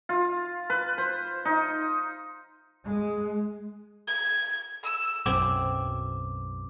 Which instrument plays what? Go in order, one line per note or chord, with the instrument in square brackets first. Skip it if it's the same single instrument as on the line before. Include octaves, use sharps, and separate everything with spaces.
[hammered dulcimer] F4
B4
C5
D#4
[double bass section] G#3
[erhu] G#6
E6
[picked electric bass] B1 F#2 [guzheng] C4 G#5 [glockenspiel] D6